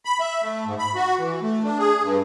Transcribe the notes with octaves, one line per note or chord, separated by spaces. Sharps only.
B5
E5
A3
G#2
B5
F#4
E3
A3
D4
G#4
G2